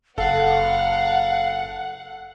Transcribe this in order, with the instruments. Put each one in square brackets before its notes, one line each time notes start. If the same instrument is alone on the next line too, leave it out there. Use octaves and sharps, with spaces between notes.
[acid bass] F#1 [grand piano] A4 [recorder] F5 [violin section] F#5